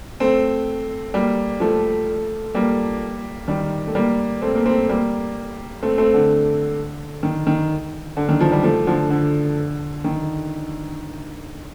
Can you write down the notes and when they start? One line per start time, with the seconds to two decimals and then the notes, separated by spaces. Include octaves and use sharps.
0.20 A3 C4
1.14 G3 A#3
1.60 F3 A3
2.54 G3 A#3
3.48 D#3 G3
3.87 A3
3.95 G3 A#3
4.42 A3 C4
4.55 A#3
4.66 A3 C4
4.89 G3 A#3
5.83 A3 C4
5.98 A3 C4
6.14 D3
7.23 D#3
7.47 D#3
8.17 D3
8.29 D#3
8.41 F3
8.52 G3
8.64 F3 A3
8.87 D3 F3
9.10 D3
10.04 D#3